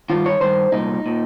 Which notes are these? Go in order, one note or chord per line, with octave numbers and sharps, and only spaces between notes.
G2 D#3 F4
C#5
G2 D#3 C5
C2 A#2 D#4
A#2